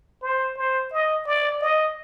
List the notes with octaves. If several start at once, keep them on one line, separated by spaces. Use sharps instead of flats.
C5
C5
D#5
D5
D#5